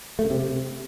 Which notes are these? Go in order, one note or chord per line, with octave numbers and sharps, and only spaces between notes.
A3
C#3
C3